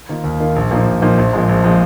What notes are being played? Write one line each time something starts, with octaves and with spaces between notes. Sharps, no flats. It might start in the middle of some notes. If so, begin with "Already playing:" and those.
D#3 A#3 F4
D#2
D#3 A#3 F4
A#1
A#2 F3 A#3 D#4
A#1
A#2 F3 A#3 D#4
A#1
A#2 F3 G#3
A#1
A#2 F3 G#3